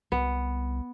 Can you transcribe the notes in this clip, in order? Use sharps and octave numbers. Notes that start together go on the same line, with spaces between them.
C2 B3